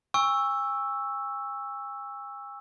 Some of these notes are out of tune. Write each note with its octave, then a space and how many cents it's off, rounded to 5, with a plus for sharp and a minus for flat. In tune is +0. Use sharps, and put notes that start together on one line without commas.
G#5 -40 C#6 +0 E6 +0